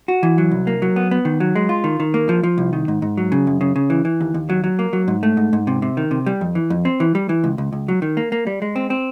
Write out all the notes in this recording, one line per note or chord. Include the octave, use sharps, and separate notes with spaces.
F#4
E3
F#3
C2
A#3
F#3
B3
B3
D#3
F#3
G#3
F4
D#3
D#3
A#3
F3
F3
C2
D#3
G#2
G#2
F#3
C#3
F#2
C#3
C#3
E3
E3
D#2
D#2
F#3
F#3
A#3
F#3
G#2
A3
G#2
G#2
C3
C3
D#3
C3
G3
F2
E3
F2
C4
E3
G3
E3
C#2
C#2
C#2
F#3
D#3
A#3
A#3
G3
G#3
C4
C4